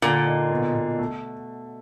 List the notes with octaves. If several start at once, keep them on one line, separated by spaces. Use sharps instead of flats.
A#2 D3
D#4
B2
B2
A3